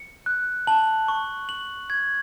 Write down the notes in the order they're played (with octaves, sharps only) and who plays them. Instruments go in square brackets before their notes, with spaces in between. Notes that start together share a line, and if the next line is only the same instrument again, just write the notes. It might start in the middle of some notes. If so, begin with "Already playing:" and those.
Already playing: [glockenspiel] C#7
F#6
[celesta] A5 [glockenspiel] F#7
[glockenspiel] C#6
F#7
G#6